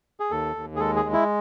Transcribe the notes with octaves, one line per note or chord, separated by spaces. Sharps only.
G#4
D#2 A4
D#2
G#4
G#3 A4
G#4
G#3
E4